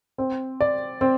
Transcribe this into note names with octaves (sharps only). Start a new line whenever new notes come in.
C4
D5
C4